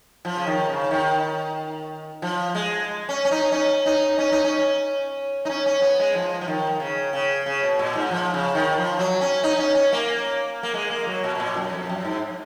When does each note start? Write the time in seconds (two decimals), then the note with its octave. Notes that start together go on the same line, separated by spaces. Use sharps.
0.25 F3
0.37 C#3
0.47 D#3
0.69 C#3
0.91 D#3
2.22 F3
2.55 G#3
3.09 C#4
3.25 C#4
3.31 D#4
3.52 C#4
3.86 D#4
4.18 C#4
4.32 D#4
4.44 C#4
5.45 D#4
5.49 C#4
5.66 C#4
5.82 B3
5.99 G#3
6.15 F3
6.41 F3
6.48 D#3
6.80 C#3
7.13 C#3
7.46 C#3
7.63 B2
7.79 A#2
7.95 G#2
8.11 F3
8.34 C#3
8.55 D#3
8.78 F3
8.99 F#3
9.21 C#4
9.43 D#4
9.59 C#4
9.75 C#4
9.93 A#3
10.63 A#3
10.74 G#3
10.90 A#3
11.07 F#3
11.24 B2
11.35 B2
11.40 A#2
11.57 F#2
11.73 F2
11.89 F#2
12.05 G#2